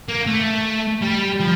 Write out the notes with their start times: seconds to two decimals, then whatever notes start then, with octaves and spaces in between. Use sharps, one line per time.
0.08 A#3
0.27 A3
1.02 G3
1.40 F3